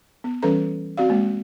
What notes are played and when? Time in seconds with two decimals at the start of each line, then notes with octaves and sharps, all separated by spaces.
0.24 B3
0.43 E3 G3 C#4 A4 B4 A#5
0.97 C4 F#4 D5 F5
1.10 G#3 A#3